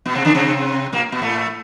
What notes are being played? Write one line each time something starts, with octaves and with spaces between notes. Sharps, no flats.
B2 B3
C3 C4
D3 D4
C3 C4
A#2 A#3
B2 B3
A2 A3